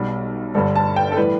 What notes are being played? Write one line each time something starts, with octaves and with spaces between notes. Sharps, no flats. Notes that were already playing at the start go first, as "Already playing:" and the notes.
Already playing: B1 B2 G3
G1 G2 D3 G3 A4
A5
G5
A4
A2 E3 G3 B4